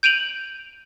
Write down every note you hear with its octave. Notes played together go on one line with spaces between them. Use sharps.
G6 D7 D#7 F7 F#7